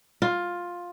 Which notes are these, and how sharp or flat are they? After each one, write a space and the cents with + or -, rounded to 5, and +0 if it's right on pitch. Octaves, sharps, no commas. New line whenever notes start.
F4 +10